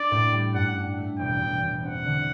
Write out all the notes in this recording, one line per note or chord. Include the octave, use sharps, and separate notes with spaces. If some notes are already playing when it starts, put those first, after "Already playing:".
Already playing: D4 D5
A2
G3
G2 F#5
D4
A3
E1 G5
E1
E1
C4 F#5
D3